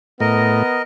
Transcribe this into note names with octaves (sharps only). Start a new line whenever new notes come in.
A2 B3 A#4 D#5